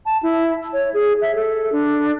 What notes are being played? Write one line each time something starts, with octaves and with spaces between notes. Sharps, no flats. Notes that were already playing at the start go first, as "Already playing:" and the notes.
A5
E4
C#5
G#4
E5
A4
D4